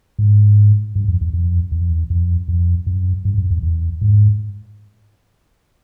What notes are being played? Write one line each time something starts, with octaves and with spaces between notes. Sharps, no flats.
G#2
G2
F2
E2
F2
E2
F2
E2
F2
F2
F#2
G2
F#2
E2
E2
G#2